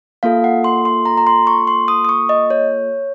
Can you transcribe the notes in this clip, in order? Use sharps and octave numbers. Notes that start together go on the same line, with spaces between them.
A#3 F4 A4 F5
F#5
C6
C6
A#5
A#5
C6
C#6
C6
D#6
D#6
C#6
D#5
C#5